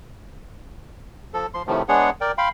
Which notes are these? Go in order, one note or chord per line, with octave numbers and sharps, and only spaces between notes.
F3 A4
F3 C6
A2 C3 D#3 F3 A3
G#3 B3 D4 G#4 C#5 F#5
A#4 D5 G5
F5 G5 B5 C6